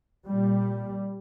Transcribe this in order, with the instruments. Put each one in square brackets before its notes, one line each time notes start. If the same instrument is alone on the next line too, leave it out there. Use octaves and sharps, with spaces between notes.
[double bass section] A#2 G3